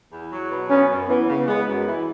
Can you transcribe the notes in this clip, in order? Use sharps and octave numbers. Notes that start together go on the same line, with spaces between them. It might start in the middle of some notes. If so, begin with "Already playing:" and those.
E2
F#3
B2
B3 C#4
F#2
E3 B3
C#3
G#3 B3
F#2
E3